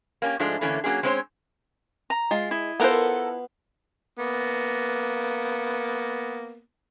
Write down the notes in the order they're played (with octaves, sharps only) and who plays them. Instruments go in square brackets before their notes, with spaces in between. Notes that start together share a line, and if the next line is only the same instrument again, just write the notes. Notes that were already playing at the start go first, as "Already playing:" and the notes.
[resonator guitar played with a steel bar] A#3 C#4 G4
G#2 F3 G#3 A3 D4
D3 E3 A3 A#3 C#4
F#3 A#3 C#4 G#4
G#3 C4 C#4 D#4 C5 C#5
[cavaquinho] A#5
[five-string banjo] G#3 [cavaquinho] F4
[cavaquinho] E4 D#5
[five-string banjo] B3 F4 C5 [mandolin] A4 A#4 F#5
[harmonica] A#3 B3